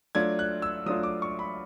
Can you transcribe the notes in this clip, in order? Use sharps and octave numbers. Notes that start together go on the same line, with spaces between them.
F#3 A3 D4 F4 G#6
F#6
E6
F#3 A3 D4 F4 D#6
D6
C#6
B5